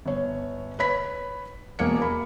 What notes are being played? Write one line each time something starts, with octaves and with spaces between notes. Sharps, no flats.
G1 C#5
B4 C#5 B5 B6
E1 A#3 C#7
A#4 B5